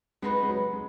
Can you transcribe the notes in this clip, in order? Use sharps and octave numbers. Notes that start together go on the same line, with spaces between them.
G#3 B3 D#4 F#4 B4
G#3
F#3
G#3